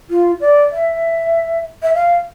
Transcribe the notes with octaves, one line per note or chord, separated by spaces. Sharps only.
F4
D5
E5
E5
F5